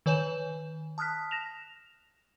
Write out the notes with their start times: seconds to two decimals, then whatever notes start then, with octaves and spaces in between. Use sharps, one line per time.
0.06 D#3 B4 C#5 G#5 G6 E7
0.98 A5 D#6 F6 F#6 B6
1.31 A#6 E7 F7